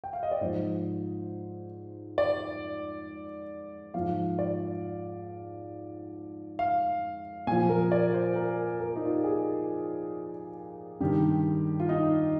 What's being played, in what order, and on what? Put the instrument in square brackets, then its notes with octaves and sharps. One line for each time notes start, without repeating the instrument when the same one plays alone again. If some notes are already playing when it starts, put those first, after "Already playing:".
[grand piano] G5
F5
D#5
D5
G#2 F3 C5
D5
G#2 F3 F5
D5
F5
A#2 F3 G#5
A#4
D5
C5
A#4
A#4
D#4
F4
G4
G#4
G2 D#3 G4
F4
D#4